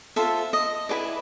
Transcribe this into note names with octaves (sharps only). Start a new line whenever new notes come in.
F4 A4 C5 E5
D#5
E4 G#4 B4 D5